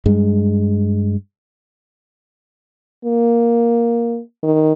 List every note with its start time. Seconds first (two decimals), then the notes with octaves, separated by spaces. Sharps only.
0.06 G2 G#3
3.05 A#3
4.43 D#3